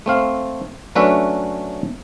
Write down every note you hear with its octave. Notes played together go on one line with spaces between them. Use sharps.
A3 C4 F5
F#3 A3 C#4 D4 B4 E5